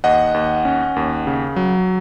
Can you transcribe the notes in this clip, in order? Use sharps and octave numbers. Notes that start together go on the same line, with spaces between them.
D#2 D#5 F#5
D#2
C#4
D#2
C#3
F#3